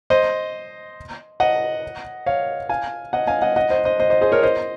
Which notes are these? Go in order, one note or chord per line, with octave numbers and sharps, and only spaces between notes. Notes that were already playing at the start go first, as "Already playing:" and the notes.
C5 D#5
D#5 F#5
C#5 F5
F5 G#5
D#5 F#5
F5 G#5
D#5 F#5
D#5 F#5
C5 D#5
C5 D#5
C5 D#5
C5 D#5
G#4 C5
A#4 C#5
C5 D#5